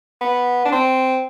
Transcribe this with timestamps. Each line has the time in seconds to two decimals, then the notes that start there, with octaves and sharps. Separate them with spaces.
0.21 B3
0.65 D4
0.72 C4